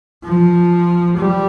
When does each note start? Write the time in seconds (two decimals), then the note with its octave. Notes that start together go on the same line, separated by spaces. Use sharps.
0.24 F3
1.17 G3